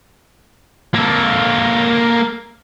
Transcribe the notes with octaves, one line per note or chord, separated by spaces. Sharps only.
A#3 A4